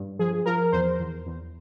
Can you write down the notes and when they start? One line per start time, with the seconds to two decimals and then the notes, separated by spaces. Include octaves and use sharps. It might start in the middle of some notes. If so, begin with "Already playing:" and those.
Already playing: G2
0.19 F3 G#4
0.46 F3 A#4
0.72 E2 C5
0.99 E2
1.26 E2